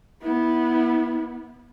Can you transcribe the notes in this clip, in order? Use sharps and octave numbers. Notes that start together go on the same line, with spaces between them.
B3 E4